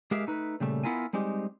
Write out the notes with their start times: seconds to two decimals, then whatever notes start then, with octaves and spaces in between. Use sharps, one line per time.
0.11 G#3 G4 G#4 A#4 E5 F5
0.27 A3 D#4 B4
0.60 A#2 C#3 G3 A3
0.84 B3 E4 F4 A#4 G#5
1.13 G3 G#3 C4 D#4 G4